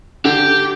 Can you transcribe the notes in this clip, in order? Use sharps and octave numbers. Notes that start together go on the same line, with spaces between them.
D3 G4